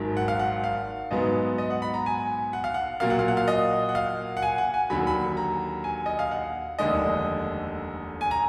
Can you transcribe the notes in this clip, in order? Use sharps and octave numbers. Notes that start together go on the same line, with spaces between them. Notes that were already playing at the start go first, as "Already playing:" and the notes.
Already playing: G#1 G#2 D#3 F#3
F#5
F5
F#5
F5
G#2 F#3 B3 D#5
D#5
F#5
B5
A#5
G#5
F#5
F5
F#5
A#2 F#3 A#3 F5
F#5
F5
F#5
F5
D#5
F#5
F5
F#5
G#5
F#5
G#5
D#2 D3 F#3 B5
B5
A#5
G#5
D#5
F5
F#5
F1 D#2 D3 G#3 D4 D#5
G#5
A#5